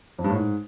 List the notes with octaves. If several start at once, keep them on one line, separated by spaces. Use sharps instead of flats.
F2
G2
A2
G#2